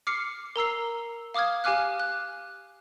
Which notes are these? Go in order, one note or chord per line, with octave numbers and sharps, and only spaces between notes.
D6 F6 C7 C#7
A#4 A#5 E6 C7
F5 D6 D#6 F6 G#6
G4 F5 G#5 D6 F6 F#6
F#6